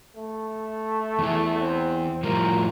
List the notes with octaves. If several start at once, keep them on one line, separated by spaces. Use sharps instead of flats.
A3
E2 E3
C4
A2 F3 G3 A#4